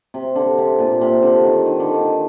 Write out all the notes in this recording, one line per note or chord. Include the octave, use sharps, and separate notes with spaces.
C3
D3
C3
A#2
C3
D3
D#3
D#3
D3
D#3